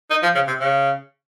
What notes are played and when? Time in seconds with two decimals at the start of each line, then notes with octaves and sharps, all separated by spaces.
0.11 D#4
0.23 F3
0.35 C#3
0.48 C3
0.60 C#3